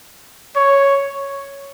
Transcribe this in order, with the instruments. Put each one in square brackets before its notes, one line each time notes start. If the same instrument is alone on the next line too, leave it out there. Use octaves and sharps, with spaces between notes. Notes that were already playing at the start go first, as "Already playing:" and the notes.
[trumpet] C#5